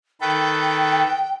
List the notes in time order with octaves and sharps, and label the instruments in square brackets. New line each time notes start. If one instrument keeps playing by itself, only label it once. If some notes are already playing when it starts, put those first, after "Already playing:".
[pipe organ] D#3 A4 B4 [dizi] G5